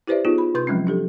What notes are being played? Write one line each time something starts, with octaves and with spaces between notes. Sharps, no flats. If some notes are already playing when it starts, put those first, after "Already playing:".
E4 G4 B4 C5 D5 E5
B3 D#4 F4 G#4
B5
C3 B4 C6 G6
F3 F#3 G#3 C4 C#4
D4 G4 A4